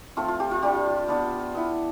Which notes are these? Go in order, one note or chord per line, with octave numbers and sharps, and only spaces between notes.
F3 A3 C4 F4
F4
G4
F4
G3 D4 F4 G4
B3 D4 F4
B3 E4